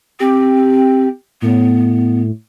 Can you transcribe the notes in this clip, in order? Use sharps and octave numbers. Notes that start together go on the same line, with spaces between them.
C4 G4
A2 B3